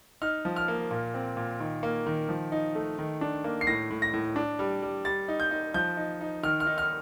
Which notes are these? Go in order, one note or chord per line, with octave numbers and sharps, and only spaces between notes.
D#4 F6
F3
F6
A#3
A#2
C4
A#2
D#3
A#3
D#3
F3
D#4
A3
D#3
D4
A#3
C7
A2 A#6
A2
A#6
A2
D4
G3
G3
G3 A6
D#4
G6
D#4
F3 G6
D#4
D#4
D#3 F6
F6
D#4
F6